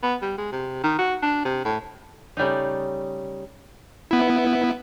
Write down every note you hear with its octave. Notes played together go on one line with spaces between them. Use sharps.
B3
G3
G#3
C3
D#3
F#4
D4
C3
A2
C#3 G3 A3 D#4
B3 E4